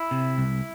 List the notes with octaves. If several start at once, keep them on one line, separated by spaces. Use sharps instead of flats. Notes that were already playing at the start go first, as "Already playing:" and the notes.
Already playing: E4
C3
C2